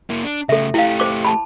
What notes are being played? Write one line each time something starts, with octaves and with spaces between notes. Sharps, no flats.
A#3 E4
D4
C#3 A3 A4 E5
A3 E4 G4 F5
C5 D6
A5 B5